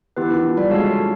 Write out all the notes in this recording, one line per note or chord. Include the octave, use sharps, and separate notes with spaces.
E3 B3 E4 G4 B4
D#3
F3
G3
G#3 F#4 A4 C#5 F5 A5
A3